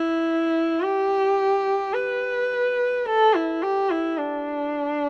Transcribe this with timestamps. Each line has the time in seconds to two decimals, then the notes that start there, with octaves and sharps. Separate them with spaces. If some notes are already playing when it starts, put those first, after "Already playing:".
Already playing: E4
0.82 G4
1.93 B4
3.06 A4
3.34 E4
3.62 G4
3.90 E4
4.18 D4